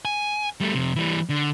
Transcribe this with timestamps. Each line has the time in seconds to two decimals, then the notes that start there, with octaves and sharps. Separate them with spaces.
0.05 G#5
0.60 G3 A3
0.75 F2 C3
0.96 E3 G3
1.29 D3